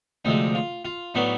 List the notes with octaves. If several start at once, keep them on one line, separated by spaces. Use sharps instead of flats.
D2 C3 F3 G#3 D#4
F4
F4
A2 F#3 B3 D4 D#4